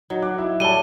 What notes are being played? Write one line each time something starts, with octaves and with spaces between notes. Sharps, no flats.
F#3 D#4
F#5 D6 F#6
E4
G3 A3 C#5 A5 D#7 G7